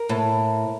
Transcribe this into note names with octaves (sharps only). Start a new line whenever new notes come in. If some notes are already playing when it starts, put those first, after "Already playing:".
Already playing: A#4
A2